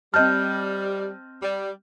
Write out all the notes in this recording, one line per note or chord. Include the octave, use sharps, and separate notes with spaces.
G3 C4 D#5 A5 F6 G6
G3